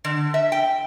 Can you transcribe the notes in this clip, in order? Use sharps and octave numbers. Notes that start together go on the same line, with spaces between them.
D3
E5
G5